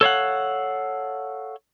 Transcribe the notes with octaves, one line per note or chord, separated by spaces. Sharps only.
A4 C#5 F5 F#5